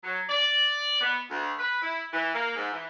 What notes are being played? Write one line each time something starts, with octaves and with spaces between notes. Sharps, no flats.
F#3
D5
B3
D2
B4
E4
E3
A#3
G#2
E3